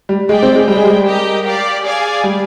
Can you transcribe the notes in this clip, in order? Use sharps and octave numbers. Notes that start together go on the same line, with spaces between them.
G3
G#3 G4 D5 G5
C4
G#3
G3 G#4 C5 G5
G#3
G3
G4 A#4 D#5 G5
G4 D5 F5
G#4 D5 F5 G#5
G3